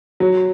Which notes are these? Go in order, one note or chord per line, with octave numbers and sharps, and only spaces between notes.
F#3